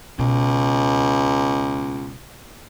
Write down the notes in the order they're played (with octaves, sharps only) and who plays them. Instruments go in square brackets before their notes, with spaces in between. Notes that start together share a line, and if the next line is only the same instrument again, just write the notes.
[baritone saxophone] C#2 [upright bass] B2